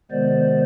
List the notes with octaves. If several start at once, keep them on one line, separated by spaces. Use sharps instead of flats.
C3 D#3 G#3 B3 C5 D5